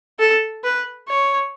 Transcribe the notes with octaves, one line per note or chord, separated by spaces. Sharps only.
A4
B4
C#5